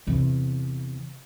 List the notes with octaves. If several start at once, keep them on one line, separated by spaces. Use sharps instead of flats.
E2 C3